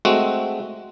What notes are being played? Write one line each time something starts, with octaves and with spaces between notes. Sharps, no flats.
G#3 A3 C4 F#4